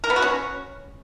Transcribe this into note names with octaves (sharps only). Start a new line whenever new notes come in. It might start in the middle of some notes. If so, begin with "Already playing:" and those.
A#4
B3
F#4
C#4